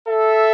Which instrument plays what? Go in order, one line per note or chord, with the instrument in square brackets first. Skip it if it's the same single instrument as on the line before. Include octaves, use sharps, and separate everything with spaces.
[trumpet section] A4 [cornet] E5